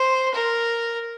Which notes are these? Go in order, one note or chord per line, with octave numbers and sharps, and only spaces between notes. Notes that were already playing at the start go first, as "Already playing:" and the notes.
Already playing: C5
A#4